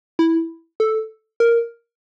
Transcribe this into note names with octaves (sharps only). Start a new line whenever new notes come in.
E4
A4
A#4